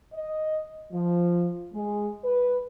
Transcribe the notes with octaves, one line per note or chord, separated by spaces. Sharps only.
D#5
F3
G#3
B4